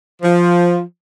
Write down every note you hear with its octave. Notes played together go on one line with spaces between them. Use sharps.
F3